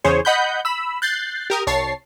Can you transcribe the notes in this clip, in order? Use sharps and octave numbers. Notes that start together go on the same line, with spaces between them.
E2 C#3 G#4 C5 C#5
D#5 F#5 B5 F#6 G6
B5 E6
F#6 G6 A6 C7
G4 A#4 D#6
C2 C#5 A5 C7